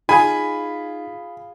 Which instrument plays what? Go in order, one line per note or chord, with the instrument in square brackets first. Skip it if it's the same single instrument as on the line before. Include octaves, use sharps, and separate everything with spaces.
[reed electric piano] D#4 [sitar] F4 G#4 [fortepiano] G#5 [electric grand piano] B5